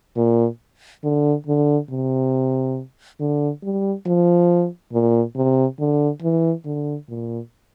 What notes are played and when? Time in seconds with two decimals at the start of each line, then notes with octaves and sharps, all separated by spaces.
0.17 A#2
1.04 D3
1.47 D3
1.90 C3
3.20 D3
3.63 G3
4.06 F3
4.93 A#2
5.36 C3
5.79 D3
6.22 E3
6.65 D3
7.09 A#2